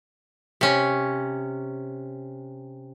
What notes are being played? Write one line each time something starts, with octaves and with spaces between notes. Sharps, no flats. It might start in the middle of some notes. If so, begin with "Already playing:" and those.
C3 C#4